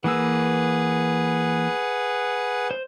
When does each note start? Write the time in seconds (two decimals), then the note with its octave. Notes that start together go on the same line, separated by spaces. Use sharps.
0.04 E3 A#3 G#4 B4 F#5 E6
2.71 C5